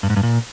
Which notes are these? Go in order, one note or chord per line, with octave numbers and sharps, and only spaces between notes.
G2
G#2
G2
A#2